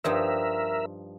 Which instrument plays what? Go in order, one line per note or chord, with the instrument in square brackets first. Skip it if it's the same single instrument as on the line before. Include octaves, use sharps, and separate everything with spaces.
[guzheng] G2 F3 D#4 [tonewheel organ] A#4 E5